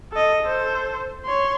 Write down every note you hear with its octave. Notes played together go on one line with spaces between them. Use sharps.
A4 D#5
A4 C5
C#5 C6